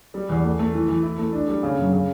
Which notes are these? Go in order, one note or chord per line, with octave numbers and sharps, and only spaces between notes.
G3
E2
A3
A3
E3
E3
E4
A3
D4
G3
C#3
F#2
C#3